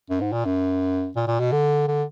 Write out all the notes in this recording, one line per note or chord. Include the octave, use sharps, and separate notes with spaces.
F#2
G#2
A#2
F#2
A#2
A#2
B2
D3
D3